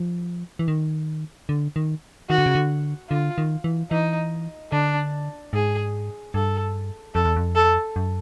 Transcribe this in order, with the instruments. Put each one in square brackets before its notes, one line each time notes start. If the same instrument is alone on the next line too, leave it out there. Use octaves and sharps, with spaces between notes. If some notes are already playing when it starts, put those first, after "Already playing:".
Already playing: [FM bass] F3
E3
D#3
D3
D#3
[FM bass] D#3 [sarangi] F#4
[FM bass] D3
C#3
D3
[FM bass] D3 [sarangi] F4
[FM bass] D#3
E3
[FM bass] E3 [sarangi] D#4
[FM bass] D3 [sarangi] D4
[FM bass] G#2 [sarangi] G#4
[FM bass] G2 [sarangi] A4
[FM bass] F2 [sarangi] A4
[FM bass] E2
F2
[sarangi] A4
[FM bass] F#2